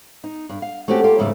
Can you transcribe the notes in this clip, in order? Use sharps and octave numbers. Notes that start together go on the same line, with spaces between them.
D#4
G2
F5
A3 C4 C#4 F#4 G4
A3 A#3 F4 G4
F2 G#2 C#3 E3 G3 A3